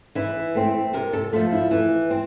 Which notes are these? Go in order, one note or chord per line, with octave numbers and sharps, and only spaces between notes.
E3 E4
A3 C4
C3 A#4
A4
F3 A3 F4
E4
E3
C4